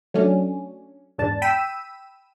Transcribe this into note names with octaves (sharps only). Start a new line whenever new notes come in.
F#3 A3 C#4 D4
E2 G#2 D4 A5
G5 B5 E6 B6 D#7 E7